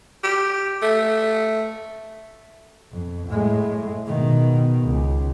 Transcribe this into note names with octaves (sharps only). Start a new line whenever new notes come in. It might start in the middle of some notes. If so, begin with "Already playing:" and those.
G4
A3
F2
A2 G#3
B2 D#3
C#2